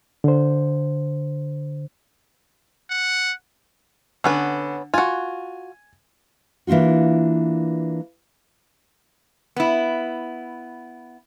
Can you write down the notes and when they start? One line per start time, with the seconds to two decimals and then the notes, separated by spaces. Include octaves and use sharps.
0.24 D3 C5
2.90 F#5
4.24 D3 B3 C#4 B4
4.94 F4 F#4 G#5
6.67 E3 A#3 D4 F4 F#4
9.56 B3 E4